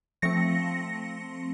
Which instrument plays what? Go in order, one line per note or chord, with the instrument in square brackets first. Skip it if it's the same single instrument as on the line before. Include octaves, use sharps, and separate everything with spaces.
[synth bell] F3 A3 C4 A#6 C#7